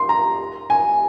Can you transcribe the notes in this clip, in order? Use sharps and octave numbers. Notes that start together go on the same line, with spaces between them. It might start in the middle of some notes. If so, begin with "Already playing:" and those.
Already playing: C6
A#5
G#5